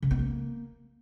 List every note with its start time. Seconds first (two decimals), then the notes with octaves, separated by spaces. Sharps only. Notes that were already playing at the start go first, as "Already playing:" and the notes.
0.03 C#3
0.11 B3
0.19 A#3